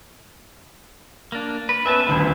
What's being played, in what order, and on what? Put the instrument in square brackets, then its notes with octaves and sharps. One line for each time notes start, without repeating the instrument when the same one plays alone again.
[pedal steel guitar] A#3 D4
B4
[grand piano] B3 C#4 B4 [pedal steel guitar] E5 G#5 A5
[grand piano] D#1 D2 B5 [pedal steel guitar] A3